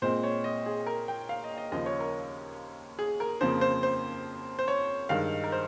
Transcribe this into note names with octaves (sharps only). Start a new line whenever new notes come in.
A#2 G#3 C4 C5
C#5
D#5
G#4
A#4
G5
F5
D#5
D#5
D#2 C#3 F3 D#5
C#5
A#4
G#4
A#4
F2 C#3 F3 A#3 C5
C5
C5
C5
C#5
G2 D#3 G#3 F5
A#4
C5